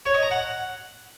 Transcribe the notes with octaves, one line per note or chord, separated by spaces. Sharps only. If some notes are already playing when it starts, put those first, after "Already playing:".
C#5
D#5
A#5
F#5